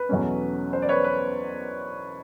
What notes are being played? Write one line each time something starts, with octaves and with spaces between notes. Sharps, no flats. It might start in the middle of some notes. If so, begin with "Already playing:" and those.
Already playing: B4
E2 B2 F#3 A3 C#4
C5
D5
B4 C#5
B4